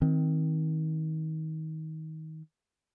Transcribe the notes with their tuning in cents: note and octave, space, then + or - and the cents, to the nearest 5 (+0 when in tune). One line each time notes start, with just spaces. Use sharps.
D#3 +25 C4 +0